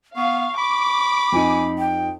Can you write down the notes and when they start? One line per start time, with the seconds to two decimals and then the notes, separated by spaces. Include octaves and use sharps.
0.16 B3 F5 C#6
0.58 B5 D6
1.32 F2 D#4 G#5
1.79 G5